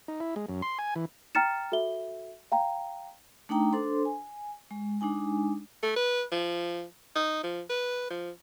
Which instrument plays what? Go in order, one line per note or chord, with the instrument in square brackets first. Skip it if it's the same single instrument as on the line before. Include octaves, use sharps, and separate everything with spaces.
[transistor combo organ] D#4
E4
G#3
F#2
C6
G#5
E3
[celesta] G5 A#5 F6 A6 C#7 E7
F#4 A4 E5 G7
F5 G5 A#5
[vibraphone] A3 D4 D#4 G5 A#5
D4 A4 C5 C6
G#5
G#3
G#3 D4 D#4 G#5
[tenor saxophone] A3
B4
F3
D#4
F3
B4
F3